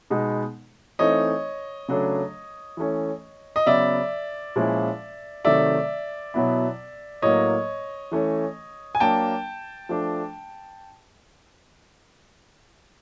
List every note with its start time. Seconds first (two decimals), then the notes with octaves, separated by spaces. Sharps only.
0.10 B2 G#3 B3 D#4
0.99 E3 A3 C4 D#4 C#5 D#5
1.88 C#3 F#3 A3 D4
2.77 E3 A3 C#4
3.56 D#5
3.66 C#3 F#3 B3 D5 E5
4.56 A#2 F3 G#3 C#4 E4
5.45 C3 D#3 F#3 A3 D5 E5
6.34 B2 F#3 B3 E4
7.22 A2 F#3 A#3 C#5 D#5
8.11 E3 A3 C#4
8.95 G#5
9.00 F#3 A#3 D4 G5 A5
9.89 F3 A3 D4